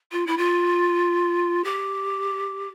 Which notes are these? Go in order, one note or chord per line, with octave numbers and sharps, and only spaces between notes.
F4
E4
F4
G4